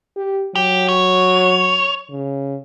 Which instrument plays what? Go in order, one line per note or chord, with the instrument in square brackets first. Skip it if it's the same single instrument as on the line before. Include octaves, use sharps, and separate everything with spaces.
[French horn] G4
[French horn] F#3 [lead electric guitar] G4
[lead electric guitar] C#5
[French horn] C#3